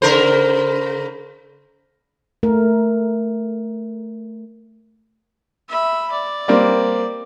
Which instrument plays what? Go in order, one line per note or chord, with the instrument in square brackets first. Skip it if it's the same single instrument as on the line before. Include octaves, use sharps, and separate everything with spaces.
[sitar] C#3 A#4 C5
[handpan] A3 A#4
[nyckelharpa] E5 B5
D5
[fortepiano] G3 A#3 C4